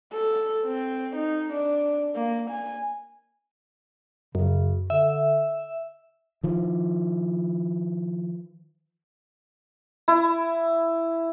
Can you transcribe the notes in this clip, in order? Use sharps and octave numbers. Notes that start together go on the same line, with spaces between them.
A4
C4
D#4
D4
A#3
G#5
F#2 C#3
D3 E5
D#3 F3
E4